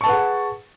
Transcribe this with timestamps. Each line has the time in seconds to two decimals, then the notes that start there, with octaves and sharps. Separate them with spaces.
0.01 C#6
0.04 A5
0.06 B4
0.09 F#5
0.12 G#4